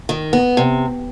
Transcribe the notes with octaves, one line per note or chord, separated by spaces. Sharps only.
D#3
B3
C3